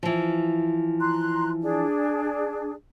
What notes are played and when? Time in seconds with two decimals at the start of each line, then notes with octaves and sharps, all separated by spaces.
0.03 E3 F3
1.00 A#5 C6 F#6
1.62 D4 G#4